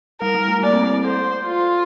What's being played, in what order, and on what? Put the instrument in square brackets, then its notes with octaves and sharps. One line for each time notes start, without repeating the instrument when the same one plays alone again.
[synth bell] G3 [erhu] A#4
[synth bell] G3
A3
[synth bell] A#3 [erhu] D5
[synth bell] C4
E4
[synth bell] A4 [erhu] C5
[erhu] F4